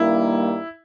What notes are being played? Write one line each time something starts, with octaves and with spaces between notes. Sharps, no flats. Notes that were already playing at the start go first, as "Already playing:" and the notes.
Already playing: G2 D#3 G3 A#3 E4